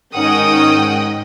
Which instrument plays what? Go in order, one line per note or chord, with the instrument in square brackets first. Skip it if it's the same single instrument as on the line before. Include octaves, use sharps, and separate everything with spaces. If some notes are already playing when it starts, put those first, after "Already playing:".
[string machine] G#2 D#5 [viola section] D#3 C#4 D#4 [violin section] F#5 G5 D#6